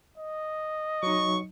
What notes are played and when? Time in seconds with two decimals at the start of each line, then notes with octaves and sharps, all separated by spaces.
0.18 D#5
1.03 F#3 D#4 C#6